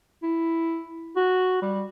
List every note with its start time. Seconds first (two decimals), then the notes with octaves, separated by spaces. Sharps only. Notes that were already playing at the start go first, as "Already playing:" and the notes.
0.23 E4
1.17 F#4
1.62 G3